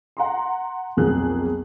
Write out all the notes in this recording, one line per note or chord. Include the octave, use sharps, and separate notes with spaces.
F#5 A#5 C6
B1 F2 A#3 G#4 F#6